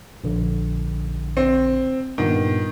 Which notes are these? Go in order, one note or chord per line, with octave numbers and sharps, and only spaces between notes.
A#1 D3
C4
G2 A#2 D#3 B3